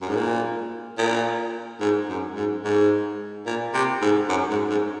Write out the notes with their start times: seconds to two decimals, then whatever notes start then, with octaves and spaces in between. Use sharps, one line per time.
0.01 F#2
0.09 G#2
0.16 A#2
0.98 A#2
1.81 G#2
2.09 F#2
2.36 G#2
2.64 G#2
3.46 A#2
3.74 C3
4.02 G#2
4.29 F#2
4.50 G#2
4.70 G#2